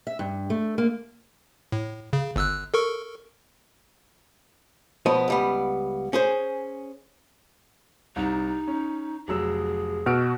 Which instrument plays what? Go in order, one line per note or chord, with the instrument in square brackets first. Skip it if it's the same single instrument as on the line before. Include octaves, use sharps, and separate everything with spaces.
[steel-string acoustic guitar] E5
G2
A3
A#3
[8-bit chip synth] A2
C#3
G1 E6 F#6
A4 A#4 C#6
[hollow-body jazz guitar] B1 F3 B3 C#5 D#5
C#2 G3 B3
C#4 G#4 C5
[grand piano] C2 [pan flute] D#4
[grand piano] C#4
[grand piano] F1 F#3 E6 [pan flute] G#4
[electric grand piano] B2 F#4 [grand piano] E6 F6 D7